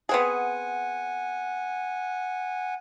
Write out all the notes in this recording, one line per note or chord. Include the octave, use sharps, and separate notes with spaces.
B3 C4 G#4 F#5 G#5